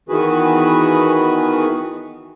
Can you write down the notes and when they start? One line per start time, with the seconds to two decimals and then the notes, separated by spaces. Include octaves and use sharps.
0.09 D#3 E3 B3 F#4 G#4 B4